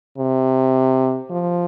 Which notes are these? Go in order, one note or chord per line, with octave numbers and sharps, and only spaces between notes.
C3
F3